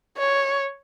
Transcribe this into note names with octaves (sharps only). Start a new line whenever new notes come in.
C#5